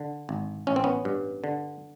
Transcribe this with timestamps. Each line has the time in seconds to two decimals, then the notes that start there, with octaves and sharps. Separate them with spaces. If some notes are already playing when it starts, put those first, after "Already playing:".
Already playing: D3
0.29 G#1
0.67 A1 C#4
0.76 C4
0.84 B3 C#4
1.05 G2
1.44 D3